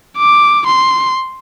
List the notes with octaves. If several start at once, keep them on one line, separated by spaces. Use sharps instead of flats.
D6
C6